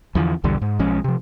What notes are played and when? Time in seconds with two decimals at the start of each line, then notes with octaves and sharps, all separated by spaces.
0.15 E2 D3 E3 F3
0.44 B1 E2 D3 G3
0.61 G#2
0.79 B1 F3 G#3 C#4
1.04 C3 F3